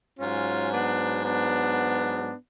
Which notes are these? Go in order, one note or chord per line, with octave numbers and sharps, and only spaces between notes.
G#2 F#3 C#4 F4
B3 D4
B3 D4